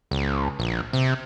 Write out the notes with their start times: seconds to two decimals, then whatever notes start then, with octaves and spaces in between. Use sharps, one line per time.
0.11 C#2
0.59 A#1
0.93 C3